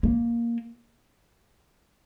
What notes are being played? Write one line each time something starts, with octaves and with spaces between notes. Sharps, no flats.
A#3